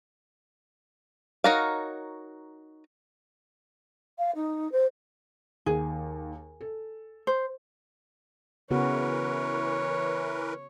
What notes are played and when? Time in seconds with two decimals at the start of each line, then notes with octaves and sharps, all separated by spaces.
1.44 D#4 F#4 A#4 C#5 F5
4.18 F5
4.35 D#4
4.72 C5
5.66 D#2 G#4
6.61 A4
7.27 C5
8.71 C#3 E3 B3 F#4 A#4 B4 C#5